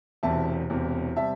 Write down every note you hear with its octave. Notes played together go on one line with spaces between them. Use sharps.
E1 E2 C3 E5 A5
E1 E2 C3
C3 G3 E5 A5